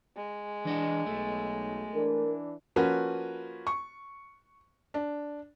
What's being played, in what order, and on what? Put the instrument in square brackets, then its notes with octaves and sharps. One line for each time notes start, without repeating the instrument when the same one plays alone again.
[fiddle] G#3
[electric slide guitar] E3 D#5 F#5 [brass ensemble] D4
[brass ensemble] B1 [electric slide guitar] A3
[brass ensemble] E3 D4 [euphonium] A#4
[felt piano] F3 A#3 C#4 F#4 B4
C#6
D4